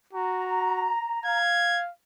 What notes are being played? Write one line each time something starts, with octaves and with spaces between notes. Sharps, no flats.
F#4 A#5
F5 G#6